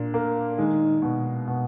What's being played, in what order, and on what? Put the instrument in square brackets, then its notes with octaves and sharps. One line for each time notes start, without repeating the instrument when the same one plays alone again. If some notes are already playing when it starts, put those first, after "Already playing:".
Already playing: [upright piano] A#2 D4
A#3
[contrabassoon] D#3 [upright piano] G#3
[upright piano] B2
B2